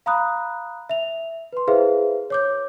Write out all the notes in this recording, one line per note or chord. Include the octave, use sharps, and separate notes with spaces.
F5 A#5 B5 D#6 F#6
E5 F7
B4 C6
E4 G#4 B4 C5 E5 F5
C#5 D6 G6